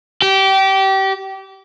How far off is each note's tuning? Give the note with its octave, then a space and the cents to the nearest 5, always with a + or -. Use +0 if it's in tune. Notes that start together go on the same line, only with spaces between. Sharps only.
G4 -25